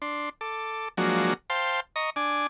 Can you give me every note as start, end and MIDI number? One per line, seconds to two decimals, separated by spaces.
0.02 0.29 62
0.02 0.29 84
0.41 0.88 69
0.41 0.88 86
0.97 1.33 53
0.97 1.33 54
0.97 1.33 56
0.97 1.33 58
0.97 1.33 62
0.97 1.33 66
1.50 1.80 72
1.50 1.80 77
1.50 1.80 79
1.50 1.80 81
1.50 1.80 84
1.96 2.10 75
1.96 2.10 82
1.96 2.10 85
2.16 2.47 62
2.16 2.47 80
2.16 2.47 86